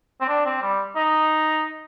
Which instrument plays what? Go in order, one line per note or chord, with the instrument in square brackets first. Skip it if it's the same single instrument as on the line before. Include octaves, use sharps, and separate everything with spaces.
[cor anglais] C4
D4
C4
G3
D#4